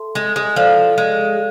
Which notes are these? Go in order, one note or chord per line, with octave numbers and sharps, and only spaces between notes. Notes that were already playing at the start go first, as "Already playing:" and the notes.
Already playing: A4 E5 A5 C6
G#3
G#3
F3 A4 D5 F5
G#3